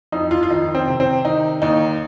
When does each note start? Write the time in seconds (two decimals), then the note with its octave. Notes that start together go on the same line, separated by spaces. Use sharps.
0.12 F2 D#4
0.31 F4
0.43 F4
0.50 D#3 D#4
0.75 C4
0.87 C3
1.00 C4
1.25 D#3 D#4
1.62 D#2 D#4